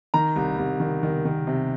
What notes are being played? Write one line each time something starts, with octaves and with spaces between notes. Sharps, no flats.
D#3 A#5
C2
C2
D#3
D#3
D#3
C3